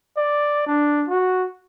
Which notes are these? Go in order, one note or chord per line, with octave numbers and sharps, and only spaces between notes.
D5
D4
F#4